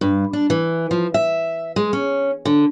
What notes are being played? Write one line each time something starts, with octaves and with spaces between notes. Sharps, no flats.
G2
D4
E3
F3
E5
G#3
C#4
D3